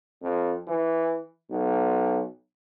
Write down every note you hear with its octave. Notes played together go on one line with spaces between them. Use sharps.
F2
E3
B1